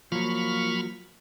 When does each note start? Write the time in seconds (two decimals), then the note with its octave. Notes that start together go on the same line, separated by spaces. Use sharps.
0.12 F3 F#3 A#3 B5 C#6 F6